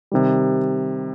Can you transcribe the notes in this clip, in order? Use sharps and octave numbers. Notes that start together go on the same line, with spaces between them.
C3 D#3 G3